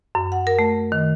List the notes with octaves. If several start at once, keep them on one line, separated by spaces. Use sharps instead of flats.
F#2
F#5
A#4
A3
D#3